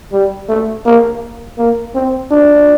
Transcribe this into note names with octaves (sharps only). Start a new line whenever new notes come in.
G3
A3
A#3
A#3
C4
D4